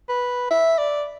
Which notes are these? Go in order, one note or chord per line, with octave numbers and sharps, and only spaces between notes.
B4
E5
D5